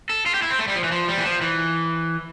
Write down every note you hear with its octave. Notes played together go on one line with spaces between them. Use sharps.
A4
F4
G4
E4
C4
A3
G3
F3
E3
F3
G3
E3
F3
E3